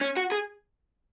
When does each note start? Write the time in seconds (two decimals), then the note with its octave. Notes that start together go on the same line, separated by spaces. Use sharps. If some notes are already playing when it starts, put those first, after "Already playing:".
0.01 C#4
0.17 F#4
0.32 G#4